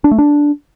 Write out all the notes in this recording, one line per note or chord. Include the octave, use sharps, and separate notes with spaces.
D4
A3
D4